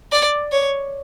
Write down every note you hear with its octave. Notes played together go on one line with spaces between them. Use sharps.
D5
C#5